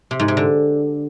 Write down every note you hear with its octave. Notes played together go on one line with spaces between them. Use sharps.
C3
G#2
C3
D3